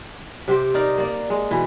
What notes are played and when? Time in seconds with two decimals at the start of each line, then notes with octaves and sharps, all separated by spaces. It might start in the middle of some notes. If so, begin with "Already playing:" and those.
0.48 C3 G4 C5 G5
0.74 D#4 A#4 D5 F5
0.98 A#3 D5
1.30 G#3
1.51 B2 E3